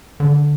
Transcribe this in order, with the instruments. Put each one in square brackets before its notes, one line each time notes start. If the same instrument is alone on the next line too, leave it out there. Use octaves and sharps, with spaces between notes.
[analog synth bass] D3